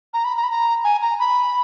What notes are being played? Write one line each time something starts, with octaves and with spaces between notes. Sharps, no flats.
A#5
B5
A#5
B5
A#5
G#5
A#5
B5